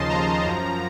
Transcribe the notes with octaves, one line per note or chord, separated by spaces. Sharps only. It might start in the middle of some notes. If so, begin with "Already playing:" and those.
Already playing: D#2 C#3 F3 D#5 A5 C6
A#5
F#2 F3